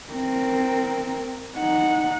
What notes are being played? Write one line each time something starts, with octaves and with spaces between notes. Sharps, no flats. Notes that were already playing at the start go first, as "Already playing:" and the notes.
C4 A#4
D#4 F#5